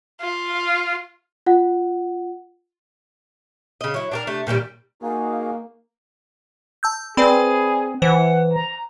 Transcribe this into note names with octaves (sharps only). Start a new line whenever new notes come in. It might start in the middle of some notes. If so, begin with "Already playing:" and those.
F4
F4 F#5
C#3 D#5
F#3 E4
D4 G4 A#4
C3 A3
A#2 D#3 E3 G3
A#3 D#4 F#4 G#4 F5
A5 E6 G6
C4 G#4 B4 D5 B5
E3 C5 F#5
A#5